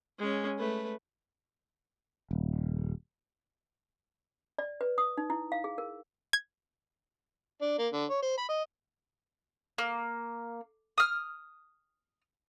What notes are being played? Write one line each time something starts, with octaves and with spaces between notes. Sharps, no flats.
G#3 C#4
A3 B4
D#1
D5
B4
D#6
D#4
E4
F5
G#4
A#4
G#6
D4
A#3
D3
C#5
C5
B5
D#5
A#3
D#6 F6